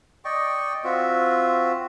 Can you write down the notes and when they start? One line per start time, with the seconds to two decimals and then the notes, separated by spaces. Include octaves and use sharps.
0.25 D5 D#5 G5 C#6
0.84 C4 F4 F#4 E5